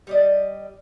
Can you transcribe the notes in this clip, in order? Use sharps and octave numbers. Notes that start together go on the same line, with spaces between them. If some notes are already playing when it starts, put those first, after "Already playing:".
G3 D5 D#5